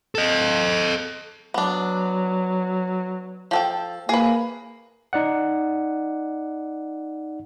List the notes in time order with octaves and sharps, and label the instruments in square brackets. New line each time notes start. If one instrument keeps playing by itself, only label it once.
[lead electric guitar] A4 D#5
[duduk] F#3 [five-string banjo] B3 D4
[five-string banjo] F3 A4 G5
[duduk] A#3 [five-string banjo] G#4 B4
[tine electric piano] D#4 D5 F#5